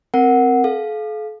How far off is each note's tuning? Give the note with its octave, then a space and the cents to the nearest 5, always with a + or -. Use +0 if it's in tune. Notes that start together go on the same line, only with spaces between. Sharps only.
C4 +0 A#4 +0 F#5 +0
A4 -45 F5 +0